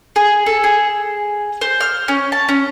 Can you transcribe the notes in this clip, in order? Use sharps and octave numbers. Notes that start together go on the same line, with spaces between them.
G#4
A4
G#4
C5
F6
C#4
A5
C#4